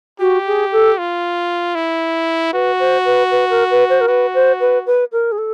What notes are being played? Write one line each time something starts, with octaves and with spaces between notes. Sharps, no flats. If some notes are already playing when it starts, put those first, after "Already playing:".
F#4 G4
G#4
A4
F4
E4
F#4 B4
C5
B4
B4
A#4
B4
C5
A#4
F#4 B4
C5
B4
B4
A#4
G#4
A4